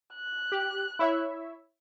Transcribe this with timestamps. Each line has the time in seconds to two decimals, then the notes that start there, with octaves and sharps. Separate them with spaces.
0.15 F#6
0.52 G4
0.99 E4 C#5 E5